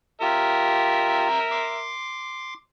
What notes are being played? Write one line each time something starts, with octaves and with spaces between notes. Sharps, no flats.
F4 G4 A#4 E5
C6 D6